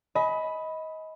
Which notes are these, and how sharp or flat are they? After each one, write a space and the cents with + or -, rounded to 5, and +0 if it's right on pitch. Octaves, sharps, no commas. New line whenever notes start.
D#5 +25 G#5 +35 B5 +0